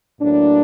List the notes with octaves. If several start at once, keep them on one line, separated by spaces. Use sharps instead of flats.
A2 F#3 A#3 D4